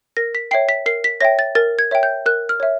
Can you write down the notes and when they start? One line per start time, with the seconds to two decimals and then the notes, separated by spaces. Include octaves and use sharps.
0.17 A#4 A#6
0.35 B6
0.51 C#5 E5 G5 C7
0.69 B6
0.86 A#4 C7
1.04 B6
1.20 C#5 E5 G5 A#6
1.39 A6
1.55 A#4 A6
1.79 G#6
1.91 C#5 E5 G5
2.03 G6
2.26 A#4 F#6
2.49 F6
2.60 C#5 E5